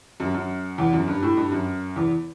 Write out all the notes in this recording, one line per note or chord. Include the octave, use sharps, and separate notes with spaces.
F#2
F#2
E2
F#2
G2
A2
G2
F#2
E2